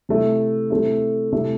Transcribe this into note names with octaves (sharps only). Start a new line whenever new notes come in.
C3 A3 E4
C3 A3 C4 E4
C3 A3 E4